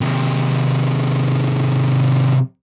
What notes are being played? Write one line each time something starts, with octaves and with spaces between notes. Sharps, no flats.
C3 D#3